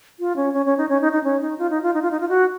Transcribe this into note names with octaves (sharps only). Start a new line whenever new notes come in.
F4
C#4
C#4
C#4
D#4
C#4
D#4
D#4
C#4
D#4
F4
D#4
F4
D#4
F4
D#4
F4
F#4